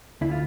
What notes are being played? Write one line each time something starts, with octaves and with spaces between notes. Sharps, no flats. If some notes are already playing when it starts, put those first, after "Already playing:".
D2 E4
F4